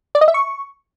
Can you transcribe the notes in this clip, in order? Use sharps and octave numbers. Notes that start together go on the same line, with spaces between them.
D5
D#5
E5
C#6